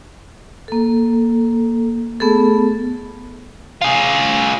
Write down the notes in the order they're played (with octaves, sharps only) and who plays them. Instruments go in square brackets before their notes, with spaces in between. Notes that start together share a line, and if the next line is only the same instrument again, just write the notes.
[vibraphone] A#3 A4
A3 B3 G#4 A4
[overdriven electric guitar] F4 G#4